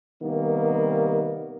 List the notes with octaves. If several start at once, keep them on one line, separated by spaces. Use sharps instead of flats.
C3 D#3 G3 A#3 B3